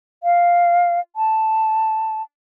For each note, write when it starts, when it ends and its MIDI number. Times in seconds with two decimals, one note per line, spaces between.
0.23 1.00 77
1.16 2.22 81